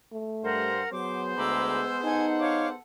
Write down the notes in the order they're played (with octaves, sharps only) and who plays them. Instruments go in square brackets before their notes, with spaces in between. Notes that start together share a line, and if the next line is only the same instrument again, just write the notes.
[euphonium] A3
[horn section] G2 G4 C5 [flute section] A#4 F#5
[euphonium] F#3 [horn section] B3 G#4 C5 [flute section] D6
[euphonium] D2 [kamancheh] G#3 E6 [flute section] A#5 B5 D6
[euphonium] D#4 [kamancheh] A4 F#5 [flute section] G#5
[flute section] C#5 F5 D6